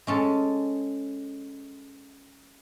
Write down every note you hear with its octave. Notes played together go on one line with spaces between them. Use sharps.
G#3 C#4 A4